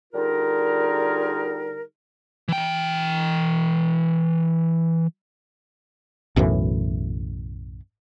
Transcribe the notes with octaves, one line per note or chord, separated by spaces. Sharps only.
D3 G3 D#4 F4 G#4 A#4
E3 G5
B1 F#2 A2 E3